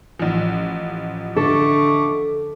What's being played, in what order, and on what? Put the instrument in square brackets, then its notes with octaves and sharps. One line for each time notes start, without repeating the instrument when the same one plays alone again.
[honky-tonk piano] A1 F3
[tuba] D3 [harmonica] A3 C#6 D6 [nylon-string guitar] A4